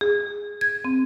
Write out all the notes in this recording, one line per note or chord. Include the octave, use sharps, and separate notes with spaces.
G#4
G#6
C4